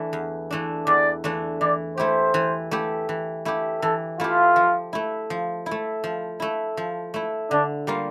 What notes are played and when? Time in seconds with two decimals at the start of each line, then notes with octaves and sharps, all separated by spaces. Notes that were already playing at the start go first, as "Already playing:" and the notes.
Already playing: E3 A3 D4
0.13 E2
0.51 E3 A3 D4
0.87 E2 D5
1.24 E3 A3 D4
1.61 E3 D5
1.97 A3 E4 G4 C5
2.34 E3
2.71 A3 E4 G4
3.09 E3
3.45 A3 E4 G4
3.82 E3 A4
4.20 A3 E4 F4 G4
4.56 F3
4.93 A3 E4
5.30 F3
5.66 E4
5.71 A3
6.04 F3
6.40 A3 E4
6.77 F3
7.14 A3 E4
7.50 D3 D4
7.87 G3 A#3 F4